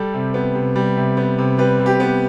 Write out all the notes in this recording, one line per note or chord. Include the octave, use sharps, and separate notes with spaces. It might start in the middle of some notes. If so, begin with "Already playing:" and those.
Already playing: G3 A4
C3
B3
C3
G3
C3
B3
C3
G3 B4
C3
G4
B3